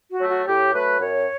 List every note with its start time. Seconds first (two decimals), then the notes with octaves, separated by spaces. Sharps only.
0.11 F#4
0.20 F#3 A3
0.30 F#4
0.46 A2 G4
0.73 F#3 A3 B4
1.00 F#2 C#5